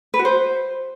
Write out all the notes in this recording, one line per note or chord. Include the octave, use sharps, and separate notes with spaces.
B4
F#4
C5